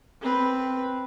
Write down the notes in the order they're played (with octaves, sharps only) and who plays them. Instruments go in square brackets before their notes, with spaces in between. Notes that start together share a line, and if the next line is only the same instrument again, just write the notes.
[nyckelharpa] C4 B4